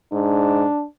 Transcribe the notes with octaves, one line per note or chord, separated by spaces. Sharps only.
G#2 D4